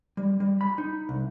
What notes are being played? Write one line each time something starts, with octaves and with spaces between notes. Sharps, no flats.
G3
G3
B5
D#4
C2